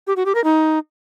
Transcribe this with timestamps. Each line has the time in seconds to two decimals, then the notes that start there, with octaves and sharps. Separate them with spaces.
0.07 G4
0.16 F#4
0.26 G4
0.35 A#4
0.44 D#4